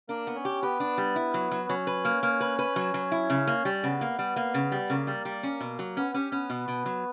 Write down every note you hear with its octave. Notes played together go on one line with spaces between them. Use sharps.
A#3 D4 A#4
B3
C#4 C#5
G4
B3 G4 B4
D4
G3
E4
F#3
F#3
F#3 C#4 C#5
B4
A#3
A#3
B4
B4
F#3
F#3
E4
C#3
A#3
G3
C#5
C#3 B3 B4
A#3
G3
A#3
C#3
G3
C#3 A#3 A#4
G3
G3
C#4
B2
F#3
B3 C#4 B4
C#4 G4
B3 C#4 B4
B2
B2
F#3